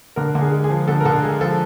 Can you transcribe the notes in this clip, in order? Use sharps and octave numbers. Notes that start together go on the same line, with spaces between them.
D3 A#4
D3
G#4
G#3
G#4
F3
D3 A4
A#4
D3 A4
G#3 G#4
F3 A4